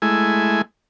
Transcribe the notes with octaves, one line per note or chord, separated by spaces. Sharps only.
G#3 A3 E4 G#5